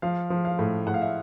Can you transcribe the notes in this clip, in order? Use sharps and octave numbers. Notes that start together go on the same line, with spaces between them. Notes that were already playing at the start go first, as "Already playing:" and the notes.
F3 F5
F3
F5
A2
A2 F#5
F5
E5